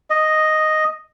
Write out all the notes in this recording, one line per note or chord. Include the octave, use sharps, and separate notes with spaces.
D#5